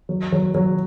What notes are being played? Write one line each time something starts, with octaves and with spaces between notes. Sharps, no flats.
F#3
F#3
F#3